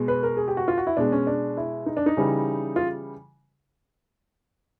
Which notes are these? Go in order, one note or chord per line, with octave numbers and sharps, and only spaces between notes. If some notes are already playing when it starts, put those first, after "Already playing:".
Already playing: B2 G#3
B4
A#4
G#4
G4
F#4
F4
F#4
E4
B2 G#3 D4
C#4
D4
E4
D#4
D4
D#4
C#3 E3 G3
F4